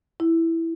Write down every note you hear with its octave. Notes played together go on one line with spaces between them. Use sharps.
E4